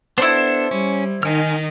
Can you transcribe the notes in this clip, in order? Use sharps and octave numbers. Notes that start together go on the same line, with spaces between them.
B3 D4 E4 A4 C5
G3 C#4
D#3 D#4 G#5 F6